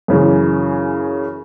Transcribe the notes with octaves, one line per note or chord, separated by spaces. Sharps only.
F#2 C#3 E3